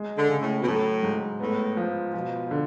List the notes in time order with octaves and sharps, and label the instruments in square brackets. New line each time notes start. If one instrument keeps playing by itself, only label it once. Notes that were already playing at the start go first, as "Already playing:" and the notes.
Already playing: [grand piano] G#3
[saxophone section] D3
[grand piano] C#3
[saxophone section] A2
B2
[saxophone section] A2 [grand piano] F#3
[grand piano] G#2
[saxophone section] A2 [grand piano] B3
[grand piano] F3
[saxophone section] B2 [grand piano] F3
[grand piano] D3